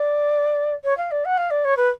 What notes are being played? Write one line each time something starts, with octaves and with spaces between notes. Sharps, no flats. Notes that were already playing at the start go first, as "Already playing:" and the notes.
Already playing: D5
C#5
F5
D5
F#5
F5
D5
C#5
B4